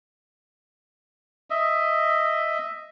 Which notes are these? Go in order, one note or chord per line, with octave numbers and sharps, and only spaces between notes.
D#5 E5